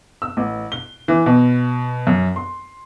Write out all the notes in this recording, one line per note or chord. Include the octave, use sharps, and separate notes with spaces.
E6
A1
G7
E3
B2
F#2
C6